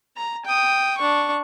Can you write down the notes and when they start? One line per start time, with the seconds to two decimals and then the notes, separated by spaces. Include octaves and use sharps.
0.17 A#5
0.45 G5 D#6
0.97 D4 C#6